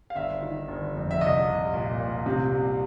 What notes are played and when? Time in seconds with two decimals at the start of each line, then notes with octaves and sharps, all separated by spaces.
0.10 F5
0.16 G1 E5
0.42 D#3
0.68 G1
0.95 F2
1.11 E5
1.21 C2 D#5
1.47 C2
1.73 A#2
2.00 A#2
2.26 C3
2.51 C2